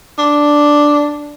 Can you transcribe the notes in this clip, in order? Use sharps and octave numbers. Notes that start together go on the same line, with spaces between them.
D4